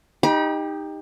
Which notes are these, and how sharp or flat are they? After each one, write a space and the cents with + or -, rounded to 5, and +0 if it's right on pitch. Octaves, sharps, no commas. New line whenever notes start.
D#4 +0 G4 +20 B5 -40